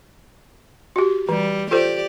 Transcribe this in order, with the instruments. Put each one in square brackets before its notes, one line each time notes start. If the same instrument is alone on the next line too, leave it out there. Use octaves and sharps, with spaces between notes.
[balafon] F#4 G4
[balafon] E3 [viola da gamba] G3
[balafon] F4 A4 C5 [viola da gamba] G4 D5